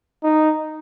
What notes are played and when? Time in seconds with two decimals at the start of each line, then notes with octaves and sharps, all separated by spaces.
0.24 D#4